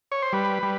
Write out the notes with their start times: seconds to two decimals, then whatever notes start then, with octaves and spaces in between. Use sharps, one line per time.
0.12 C#5
0.22 C5
0.33 G3 B4
0.63 G3